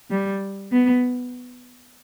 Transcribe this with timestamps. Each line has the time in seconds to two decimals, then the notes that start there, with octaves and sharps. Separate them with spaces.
0.11 G3
0.72 B3